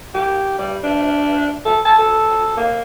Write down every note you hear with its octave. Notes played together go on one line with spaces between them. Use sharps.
G4
G3
D4
A4
A5
A4
A#3